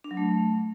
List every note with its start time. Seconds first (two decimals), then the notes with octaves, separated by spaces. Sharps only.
0.04 D4
0.11 F#3
0.17 A3